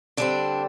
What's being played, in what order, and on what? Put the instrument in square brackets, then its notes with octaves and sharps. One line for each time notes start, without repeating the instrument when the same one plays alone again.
[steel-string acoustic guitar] D3 G3 C4 D4